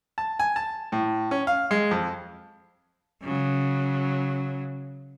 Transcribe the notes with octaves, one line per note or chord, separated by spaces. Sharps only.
A5
G#5
A5
A2
C#4
F5
G#3
F2
C#3 F#3